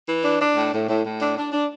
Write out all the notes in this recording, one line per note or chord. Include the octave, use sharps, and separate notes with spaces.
E3
D4
D4
A2
A2
A2
A2
D4
D4
D4